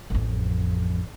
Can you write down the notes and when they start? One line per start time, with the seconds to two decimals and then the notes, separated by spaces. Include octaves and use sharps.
0.10 A1 F2